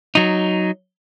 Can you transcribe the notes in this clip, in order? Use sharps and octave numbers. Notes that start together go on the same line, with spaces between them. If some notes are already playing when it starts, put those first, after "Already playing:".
F#3 D#4